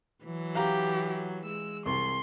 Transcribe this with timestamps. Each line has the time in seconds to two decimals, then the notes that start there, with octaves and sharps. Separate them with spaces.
0.24 E3 F#3
0.55 G4 F5 A#5
1.45 G#3 E6
1.86 C2 C3 C6